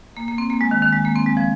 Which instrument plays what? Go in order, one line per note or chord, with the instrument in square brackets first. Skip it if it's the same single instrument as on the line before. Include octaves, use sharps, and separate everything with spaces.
[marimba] A#3
A#3
C4
A#3
G#3
D#3
D#3
G#3
A#3
C4
G#3
F3